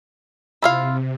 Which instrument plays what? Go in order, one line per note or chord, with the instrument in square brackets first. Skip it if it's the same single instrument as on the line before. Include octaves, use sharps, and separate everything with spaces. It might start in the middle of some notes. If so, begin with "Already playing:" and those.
[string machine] C3 [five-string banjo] E4 F4 F5